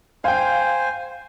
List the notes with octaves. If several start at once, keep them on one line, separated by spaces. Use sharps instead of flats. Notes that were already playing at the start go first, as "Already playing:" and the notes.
C5 F5 G5 G#5